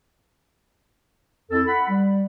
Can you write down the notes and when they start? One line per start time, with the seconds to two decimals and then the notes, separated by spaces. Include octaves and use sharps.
1.51 F2 E4 A4
1.67 F#5 B5
1.89 G3